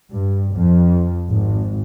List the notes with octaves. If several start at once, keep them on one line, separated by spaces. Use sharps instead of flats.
G2
F2
G#1